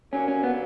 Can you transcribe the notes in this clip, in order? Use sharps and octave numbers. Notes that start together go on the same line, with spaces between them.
D#2 D3 F#3 A#3 C#4
C#4
B3